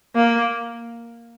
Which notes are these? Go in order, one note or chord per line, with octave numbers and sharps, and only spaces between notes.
A#3